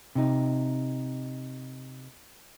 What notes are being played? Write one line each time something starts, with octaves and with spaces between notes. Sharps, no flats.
C3 D#4